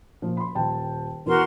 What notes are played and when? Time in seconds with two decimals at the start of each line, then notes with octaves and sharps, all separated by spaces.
0.22 A#2 F3
0.37 B5 C6
0.55 D#1 G5 A5
1.26 E2 F#4 A#4 C6